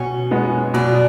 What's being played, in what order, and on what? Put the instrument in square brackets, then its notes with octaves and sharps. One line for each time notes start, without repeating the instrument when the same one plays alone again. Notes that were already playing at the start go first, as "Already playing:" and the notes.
Already playing: [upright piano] B2 [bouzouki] C#4
[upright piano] G#3 B3
[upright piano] B2 [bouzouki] D4